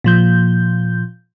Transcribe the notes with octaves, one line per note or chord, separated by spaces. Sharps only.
A#2 F3 G6